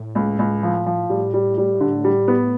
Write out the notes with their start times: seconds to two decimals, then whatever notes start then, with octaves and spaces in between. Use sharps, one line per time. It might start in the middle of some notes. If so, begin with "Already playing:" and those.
Already playing: A2
0.15 C#2
0.39 C#2
0.63 F3
0.86 F3
1.10 A2 G3
1.34 G3
1.58 G3
1.80 D3
2.04 G3
2.28 B3